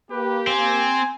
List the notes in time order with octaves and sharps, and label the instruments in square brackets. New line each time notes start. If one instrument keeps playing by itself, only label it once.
[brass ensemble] A#3 G4 [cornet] B4
[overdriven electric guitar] C4 [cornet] G#5